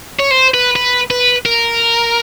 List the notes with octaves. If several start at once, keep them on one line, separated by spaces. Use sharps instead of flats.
C#5
C5
B4
B4
B4
A#4